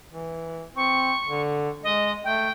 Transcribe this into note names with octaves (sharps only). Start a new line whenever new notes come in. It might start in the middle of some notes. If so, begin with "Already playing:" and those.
E3
C4 C#6
D3
G#3 D#5
A3 G5